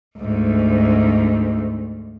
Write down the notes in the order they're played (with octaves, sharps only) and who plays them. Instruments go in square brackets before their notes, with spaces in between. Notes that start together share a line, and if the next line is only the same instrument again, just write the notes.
[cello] D2 G#2